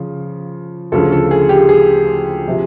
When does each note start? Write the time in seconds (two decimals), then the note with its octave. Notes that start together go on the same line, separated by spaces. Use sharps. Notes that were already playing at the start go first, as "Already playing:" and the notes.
Already playing: C#3 F3
0.92 D2 C#3 F3 A4
1.12 A4
1.31 G#4
1.49 G4
1.69 G#4
2.48 C3 F3